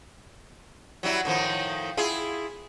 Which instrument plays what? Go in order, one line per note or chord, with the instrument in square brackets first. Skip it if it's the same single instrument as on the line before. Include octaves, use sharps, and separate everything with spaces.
[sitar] F#3 G3 E4
A2 D#3 F3
E4 F4 G#4